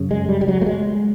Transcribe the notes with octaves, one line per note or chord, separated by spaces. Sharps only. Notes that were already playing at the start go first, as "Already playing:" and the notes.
Already playing: F#2 C#3
G#3
G3
G3
F#3
A3
G#3